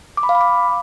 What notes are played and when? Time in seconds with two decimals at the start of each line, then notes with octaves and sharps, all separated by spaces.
0.17 D6
0.23 B5
0.29 F5
0.35 B5
0.41 D6